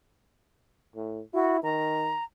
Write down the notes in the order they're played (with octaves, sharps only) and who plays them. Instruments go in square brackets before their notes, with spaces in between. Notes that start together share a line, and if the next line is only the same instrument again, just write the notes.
[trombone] A2
[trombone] E4 [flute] F#4
[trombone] D#3 [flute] A#5